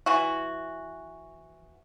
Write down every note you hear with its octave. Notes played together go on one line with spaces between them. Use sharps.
E3 F#4